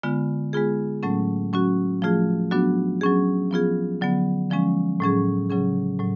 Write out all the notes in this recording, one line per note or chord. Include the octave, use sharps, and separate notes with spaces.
D3 G#3 B3 F4
G#3 B3 F4 G#4
A2 F#3 A3 C#4
F#3 C#4 F#4
F3 A3 F4 G#4
F#3 B3 D4 F#4
F#3 C#4 G#4
F3 B3 F4 G#4
D3 F#3 B3
D3 F3 G#3 C#4
A2 F#3 C#4 G#4
C#3 F#3 C#4 G#4
A2 F#3